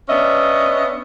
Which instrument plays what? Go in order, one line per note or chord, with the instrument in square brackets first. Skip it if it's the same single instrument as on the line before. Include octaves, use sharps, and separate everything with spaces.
[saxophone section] B3 C#4 D4 D#5 E5